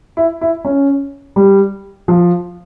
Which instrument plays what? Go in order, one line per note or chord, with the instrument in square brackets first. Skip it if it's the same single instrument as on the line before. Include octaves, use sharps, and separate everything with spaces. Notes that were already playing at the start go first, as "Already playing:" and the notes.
[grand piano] E4
E4
C#4
G3
F3